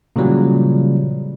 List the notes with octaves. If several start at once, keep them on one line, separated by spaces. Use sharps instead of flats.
A#2 C#3 E3 F#3 G3